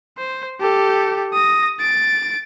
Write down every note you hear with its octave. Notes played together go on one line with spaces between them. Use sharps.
C5
G4 A4
D#6 A#6
A6 D7